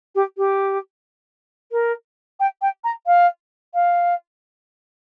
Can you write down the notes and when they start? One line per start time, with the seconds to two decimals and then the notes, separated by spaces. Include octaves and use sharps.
0.15 G4
0.37 G4
1.72 A#4
2.40 G5
2.62 G5
2.84 A#5
3.06 F5
3.74 F5